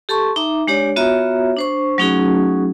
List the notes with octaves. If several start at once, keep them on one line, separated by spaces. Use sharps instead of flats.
G4 A4 A5 C6 C#6
D#4 E5 A#5 D6
G#3 D4 G4 C#5 D5
B3 F4 F#4 C#5 E5 A#5
D4 C5 C#6
F#3 A3 C#4 D#4 F#4 G#4